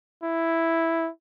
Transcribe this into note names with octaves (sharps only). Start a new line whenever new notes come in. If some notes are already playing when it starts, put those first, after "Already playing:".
E4